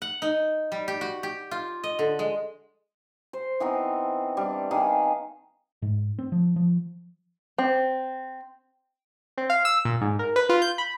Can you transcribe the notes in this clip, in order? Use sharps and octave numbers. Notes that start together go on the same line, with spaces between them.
F#5
D#4
G3
G4
F#4
G4
F4
D#5
D3
G#3
C5
E3 B3 C4 D#4
E3 G3 D4
D#3 G#4 F5
G#2
C4
F3
F3
C4
C4
F5
E6
A#2
G#2
A#4
B4
F4
G6
B5